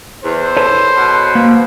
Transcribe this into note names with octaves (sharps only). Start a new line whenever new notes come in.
E2 C5
A4 B4 C#5
B2
A#3